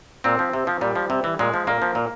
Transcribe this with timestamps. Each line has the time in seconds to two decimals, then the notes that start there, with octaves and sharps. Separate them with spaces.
0.24 A#2 C4
0.39 F3
0.53 C3
0.67 F3
0.81 A#2 G3
0.95 F3
1.10 C3
1.24 E3
1.39 A#2 G#3
1.54 F3
1.67 A#2 A#3
1.82 F3
1.95 A#2